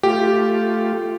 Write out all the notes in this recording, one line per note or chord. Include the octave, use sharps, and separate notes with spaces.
A3 F4 G4